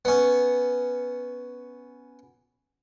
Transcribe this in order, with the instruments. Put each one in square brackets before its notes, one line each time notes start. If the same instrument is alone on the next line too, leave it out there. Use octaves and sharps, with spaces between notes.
[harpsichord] B3 C#4